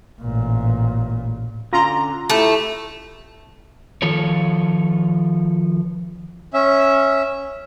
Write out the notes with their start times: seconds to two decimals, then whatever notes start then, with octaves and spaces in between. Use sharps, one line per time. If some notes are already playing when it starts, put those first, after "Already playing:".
0.22 A1 A#2
1.73 D3 C#4 F4 A#5 C6
2.30 A3 E4 G4
4.02 D#3 F3 F4 A4 C#5
6.54 C#4 E5